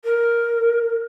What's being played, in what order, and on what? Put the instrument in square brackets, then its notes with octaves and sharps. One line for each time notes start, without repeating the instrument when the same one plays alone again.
[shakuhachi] A#4